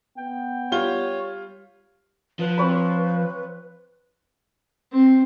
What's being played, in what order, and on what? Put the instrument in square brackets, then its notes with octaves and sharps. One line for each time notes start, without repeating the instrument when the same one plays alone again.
[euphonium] B3 [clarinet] G5
[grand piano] G3 F4 G7 [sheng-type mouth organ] C#5
[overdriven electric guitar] F3 [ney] B4
[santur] C4 C#5 B5
[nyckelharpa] C4